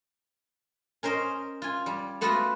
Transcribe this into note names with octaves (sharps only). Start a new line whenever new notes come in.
C#4 A#4 C5 D#5
F4 G#5
G3
A3 B3 F4 F#4 B4 E5